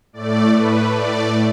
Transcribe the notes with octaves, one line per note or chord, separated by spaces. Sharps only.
A2 A3 D5
B4
D5